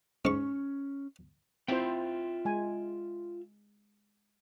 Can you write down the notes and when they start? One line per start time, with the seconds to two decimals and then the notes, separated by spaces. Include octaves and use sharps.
0.25 G#2 C#4 C#6
1.68 C4 E4 F4 C5 E5 G5
2.45 G#3 G#5